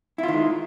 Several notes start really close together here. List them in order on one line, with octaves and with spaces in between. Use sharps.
E4 F4 D#3 G#3